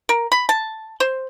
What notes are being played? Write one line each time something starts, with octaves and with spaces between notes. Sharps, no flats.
A#4
B5
A5
C5